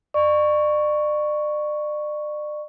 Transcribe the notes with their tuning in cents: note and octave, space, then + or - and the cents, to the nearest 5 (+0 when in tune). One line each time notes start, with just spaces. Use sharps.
D5 +35 C#6 +0